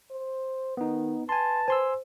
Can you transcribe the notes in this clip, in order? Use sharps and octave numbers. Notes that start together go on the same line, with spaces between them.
C5
D#3 B3 D#4
B4 G#5 A5 C6
C5 G#5 C6 E6